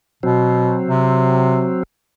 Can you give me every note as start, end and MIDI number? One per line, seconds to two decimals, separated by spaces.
0.23 0.80 47
0.23 1.83 54
0.23 1.83 60
0.87 1.72 48